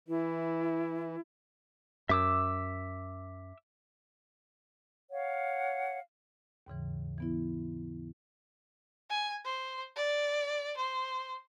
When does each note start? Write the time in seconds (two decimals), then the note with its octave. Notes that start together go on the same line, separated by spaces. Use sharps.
0.08 E3 E4
2.09 F#2 E5 D6 E6
5.11 C#5 F5 F#5
6.67 D#2 G#2 C#3 E3
7.18 E3 B3 E4
9.10 G#5
9.44 C5
9.96 D5
10.77 C5